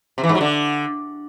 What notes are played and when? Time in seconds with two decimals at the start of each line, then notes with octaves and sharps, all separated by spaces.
0.18 C3
0.24 E3
0.29 G#2
0.35 F#3
0.41 D3